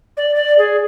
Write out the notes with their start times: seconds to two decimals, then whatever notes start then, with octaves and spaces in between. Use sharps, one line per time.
0.17 D5
0.35 D5
0.58 G#4